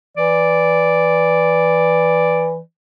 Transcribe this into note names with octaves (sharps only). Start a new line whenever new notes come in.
E3 D5